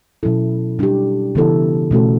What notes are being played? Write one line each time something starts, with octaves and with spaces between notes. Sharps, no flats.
B2 F#3 C#4 E4 A4
G3 D4 G4
C#3 E3 B3 E4 A4
B2 A3 C#4 F#4 A4